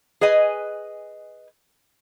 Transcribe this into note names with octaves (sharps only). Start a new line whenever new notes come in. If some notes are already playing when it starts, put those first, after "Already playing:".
G#4 B4 D#5 G#5